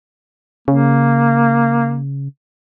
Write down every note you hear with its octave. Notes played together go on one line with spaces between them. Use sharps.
C#3 A#3